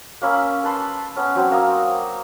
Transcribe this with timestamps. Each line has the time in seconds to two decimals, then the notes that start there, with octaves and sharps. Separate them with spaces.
0.22 A#3 C#4 B5 E6
0.64 B4 A5 B5 C6
1.16 B3 C#4
1.36 F#3 C4 C#6
1.51 A#3 A#5 D#6